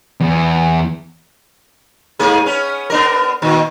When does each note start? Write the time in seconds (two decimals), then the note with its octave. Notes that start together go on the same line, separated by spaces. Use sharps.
0.20 E2
2.19 G#2 A#3 G#4
2.46 B3 C#4
2.90 B3 D4 A#4
3.42 A#2 D#3